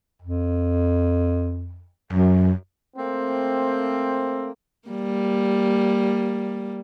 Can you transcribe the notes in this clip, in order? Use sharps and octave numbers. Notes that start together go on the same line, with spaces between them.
F2
F#2
A3 A#3 C4
G3 A#3